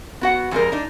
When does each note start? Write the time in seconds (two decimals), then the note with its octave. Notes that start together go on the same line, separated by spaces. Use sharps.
0.21 B3 F#4 F#5
0.51 F2 G3 G#3 A#4
0.72 D4 D#4